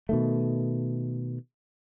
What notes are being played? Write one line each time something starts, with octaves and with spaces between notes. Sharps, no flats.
B2 D#3 A3